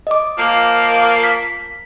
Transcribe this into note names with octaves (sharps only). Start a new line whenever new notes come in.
D#5 D6
F3 A#3
B6